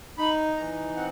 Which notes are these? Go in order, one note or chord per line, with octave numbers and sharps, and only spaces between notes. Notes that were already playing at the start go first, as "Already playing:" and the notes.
D#4 B5
E3 A#5
C4 F#5